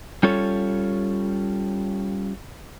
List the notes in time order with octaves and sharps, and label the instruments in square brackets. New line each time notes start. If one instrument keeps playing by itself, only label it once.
[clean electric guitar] G3 C#4 F4 A4 C#5